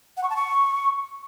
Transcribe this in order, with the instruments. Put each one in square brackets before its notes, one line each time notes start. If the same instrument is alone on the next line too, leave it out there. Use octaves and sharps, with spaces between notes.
[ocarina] F#5
C#6
A5
C#6